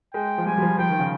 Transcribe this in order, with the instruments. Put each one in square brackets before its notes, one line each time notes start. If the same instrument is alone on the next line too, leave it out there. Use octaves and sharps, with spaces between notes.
[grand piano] G#3 [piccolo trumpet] G5
[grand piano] F3
[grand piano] G3 [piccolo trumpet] G#5
[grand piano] G3
F3
[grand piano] F3 [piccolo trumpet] G5
[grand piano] D#3
C#3